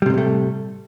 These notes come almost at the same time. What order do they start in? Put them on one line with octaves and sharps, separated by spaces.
G3 C3 F#2 A2 A3